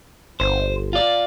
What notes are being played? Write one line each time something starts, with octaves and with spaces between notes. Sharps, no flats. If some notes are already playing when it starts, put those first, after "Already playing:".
G1 C5
F4 D5